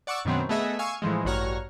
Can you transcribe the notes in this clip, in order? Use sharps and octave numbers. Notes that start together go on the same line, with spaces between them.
D5 F#5 C#6 D6 E6
F#2 B2 D#3 F#3 B3 C4
A3 B3 G#4 D#5 E5
F5 G#5 C#6 E6
A2 E3 F3 G#3
A1 G2 F#4 C#5 A#5 F6